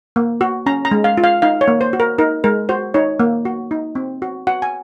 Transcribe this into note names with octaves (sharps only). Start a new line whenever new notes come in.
A#3
F#4
C#4 A#5
A#5
G#3
F5
F4
F5
D#4 F5
C#5
A#3
C5
F#4
A#4
D#4 A#4
G#3 A#4
F#4 C5
D#4 C#5
A#3
F#4
D#4
C4
F#4
F#4 F#5
G#5